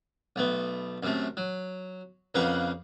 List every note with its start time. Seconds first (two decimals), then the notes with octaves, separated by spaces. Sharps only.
0.36 B1 A3 B3
1.03 F#2 C3 A3
1.37 F#3
2.35 F2 C#3 A#3 B4 F#5